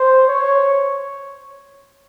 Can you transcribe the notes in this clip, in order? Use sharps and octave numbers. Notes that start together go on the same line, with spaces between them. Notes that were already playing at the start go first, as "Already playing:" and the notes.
Already playing: C5
C#5